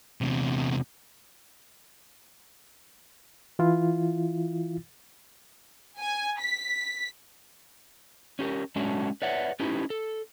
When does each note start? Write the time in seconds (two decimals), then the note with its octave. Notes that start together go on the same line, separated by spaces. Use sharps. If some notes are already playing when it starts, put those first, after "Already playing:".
0.21 E2 C3
3.59 E3 E4 F4
5.99 G#5
6.40 B6
8.39 C#4 G4 G#4 A#4
8.76 F#3 G#3 A3 C#4 D4 F#4
9.22 B4 C#5 D5 E5 F#5
9.60 C#4 D#4 E4 G4 B4
9.90 A4